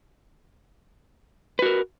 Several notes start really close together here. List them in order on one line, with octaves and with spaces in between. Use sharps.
B4 F#4 A#4